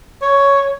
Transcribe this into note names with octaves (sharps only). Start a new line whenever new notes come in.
C#5